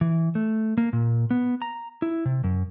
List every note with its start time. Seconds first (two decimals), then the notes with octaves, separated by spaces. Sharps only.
0.01 E3
0.35 A3
0.78 A#3
0.93 A#2
1.31 B3
1.62 A#5
2.02 E4
2.25 C3
2.44 F#2